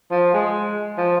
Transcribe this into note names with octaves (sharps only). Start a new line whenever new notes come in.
F3
G#3
F3